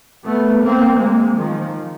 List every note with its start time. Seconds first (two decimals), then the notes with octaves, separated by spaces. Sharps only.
0.25 A3 B3
0.62 A#3 C4
1.00 G#3 A#3
1.37 D#3 F3